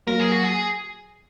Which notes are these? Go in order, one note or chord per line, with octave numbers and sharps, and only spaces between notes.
F#3 A#3 A#4
G#4
F#4
G#4